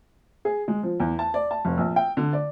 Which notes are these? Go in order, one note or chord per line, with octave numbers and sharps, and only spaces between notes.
G#4
G#3
F3
E2
A5
D5
A5
F1
A#1
G5
D3
D5